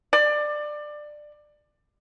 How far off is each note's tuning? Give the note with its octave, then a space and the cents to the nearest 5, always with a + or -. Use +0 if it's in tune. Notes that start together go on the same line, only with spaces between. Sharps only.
D5 +20